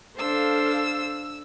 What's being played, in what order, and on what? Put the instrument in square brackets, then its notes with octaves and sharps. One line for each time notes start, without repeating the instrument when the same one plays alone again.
[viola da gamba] D4 C5 [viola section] A4 F5 [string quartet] E6